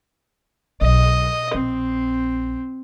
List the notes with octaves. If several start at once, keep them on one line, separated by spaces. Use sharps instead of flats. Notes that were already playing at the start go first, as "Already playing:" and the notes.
B1 D#5
A#1 C4